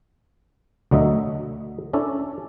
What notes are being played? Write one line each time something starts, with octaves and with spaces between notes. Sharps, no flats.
D2 D3 F#3 D#5 E5
C#4 D4 E4 A4